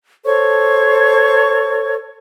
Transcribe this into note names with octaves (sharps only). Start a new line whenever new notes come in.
A4 C5 C#5 C#6